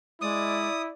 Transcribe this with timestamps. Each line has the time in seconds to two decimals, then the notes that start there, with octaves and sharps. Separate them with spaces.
0.21 G#3 E4 D5 D#6